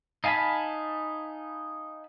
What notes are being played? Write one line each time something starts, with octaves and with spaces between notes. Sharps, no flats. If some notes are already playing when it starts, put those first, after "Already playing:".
D#4 F5 G#5 A5 B5